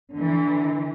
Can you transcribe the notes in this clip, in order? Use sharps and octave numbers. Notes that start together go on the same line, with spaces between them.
D3 E3